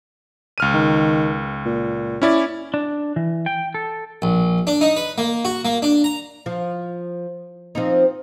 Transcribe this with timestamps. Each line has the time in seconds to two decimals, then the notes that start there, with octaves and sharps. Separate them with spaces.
0.58 C#2 F6 D#7
0.74 D#3
1.66 A#2
2.22 C#4 E4 D5
2.74 D4
3.16 E3
3.46 G5
3.75 A4
4.22 A#1
4.67 D4
4.81 D#4
4.97 B4
5.18 A#3
5.45 F#4
5.65 A#3
5.82 D4
6.04 A#5
6.46 F3
7.75 F3 C4 D#4